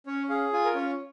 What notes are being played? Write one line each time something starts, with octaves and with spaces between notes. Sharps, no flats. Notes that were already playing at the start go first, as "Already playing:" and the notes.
C#4 C#5
G#4 F5
F4 G#5
A#4
C#4 C#5